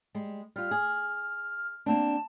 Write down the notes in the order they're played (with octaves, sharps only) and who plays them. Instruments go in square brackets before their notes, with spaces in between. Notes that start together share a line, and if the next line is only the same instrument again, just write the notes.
[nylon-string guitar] G3 G#3
[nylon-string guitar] G3 F4 [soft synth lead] F6
[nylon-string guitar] G#4
[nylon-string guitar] A#3 C4 D4 [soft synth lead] A5